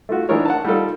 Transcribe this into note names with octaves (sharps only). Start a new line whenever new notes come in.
A3 F4 F#4
E3 D4 D#4 A#4 C#5
F#5 A5
G3 D#4 F4 A4